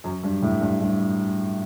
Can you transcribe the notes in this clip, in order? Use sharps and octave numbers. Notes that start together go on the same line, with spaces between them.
F#2
G2
A2
G2
G2